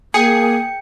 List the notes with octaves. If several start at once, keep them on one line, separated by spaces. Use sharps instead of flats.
A#3 G#4 G5 C#7